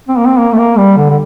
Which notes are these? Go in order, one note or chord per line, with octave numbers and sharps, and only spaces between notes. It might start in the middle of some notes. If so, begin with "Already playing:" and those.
C4
A#3
C4
A#3
A3
A#3
G3
D3
D3